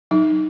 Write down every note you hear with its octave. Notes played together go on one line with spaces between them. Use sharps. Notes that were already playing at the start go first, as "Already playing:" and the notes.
F#3 D#4